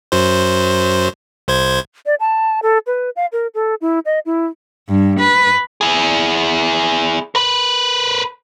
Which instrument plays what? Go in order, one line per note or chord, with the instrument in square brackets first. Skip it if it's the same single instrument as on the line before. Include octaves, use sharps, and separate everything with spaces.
[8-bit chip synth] F#2 F#3 C5
C2 C5 G#6
[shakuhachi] D5
A5
A4
B4
F5
A#4
A4
E4
D#5
E4
[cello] G2
B4
[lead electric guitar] E4 G#4
A#4 B4